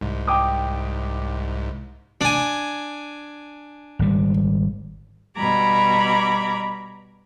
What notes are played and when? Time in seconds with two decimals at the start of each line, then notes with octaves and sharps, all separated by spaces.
0.01 C2 G#2
0.27 G5 D6 D#6
2.21 D4 G#5
3.99 G#1 G3
5.37 B2 G3 A#5 B5 D6 G#6